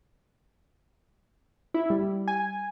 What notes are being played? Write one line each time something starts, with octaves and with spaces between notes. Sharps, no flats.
E4
G3
G#5